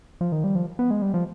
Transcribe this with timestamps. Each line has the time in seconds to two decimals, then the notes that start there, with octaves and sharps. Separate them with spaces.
0.21 F3
0.32 D#3
0.44 G3
0.55 F3
0.79 B3
0.91 G#3
1.02 G3
1.14 F3